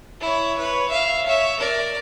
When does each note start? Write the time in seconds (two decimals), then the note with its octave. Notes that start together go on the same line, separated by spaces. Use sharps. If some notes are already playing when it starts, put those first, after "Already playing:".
0.20 E4 C#5
0.58 B4 C#5
0.89 E5 F5
1.26 C#5 E5
1.59 A#4 D5